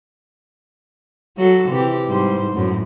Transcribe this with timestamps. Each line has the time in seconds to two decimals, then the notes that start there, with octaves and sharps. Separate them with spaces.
1.37 F#3 F#4 A4
1.68 C3 E3 G4
2.06 G#2 G3 C5
2.52 F#2 A2